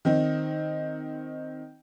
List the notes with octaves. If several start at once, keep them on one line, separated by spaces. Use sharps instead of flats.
D#3 C4 D#4